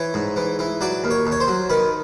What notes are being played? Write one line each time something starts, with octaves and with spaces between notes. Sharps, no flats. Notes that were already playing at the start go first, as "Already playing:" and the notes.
Already playing: E3 C#5
G#2
E3
E3
F#3 D5
D#2
C#5
D#2
C#5
C5
F#3
D#3 B4